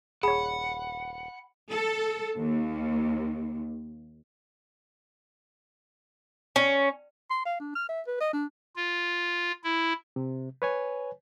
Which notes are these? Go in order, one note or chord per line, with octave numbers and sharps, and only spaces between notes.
D#1 G#4 C#5 F#5 B5
A4
D#2
C#4
C6
F5
D4
F6
E5
B4
D#5
D4
F4
E4
C3
B4 C#5 G#5